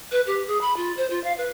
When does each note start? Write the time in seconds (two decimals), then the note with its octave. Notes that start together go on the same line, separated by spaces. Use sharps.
0.12 B4
0.27 G4
0.47 G#4
0.61 B5
0.77 F4
0.97 C5
1.10 F4
1.24 F5
1.38 B4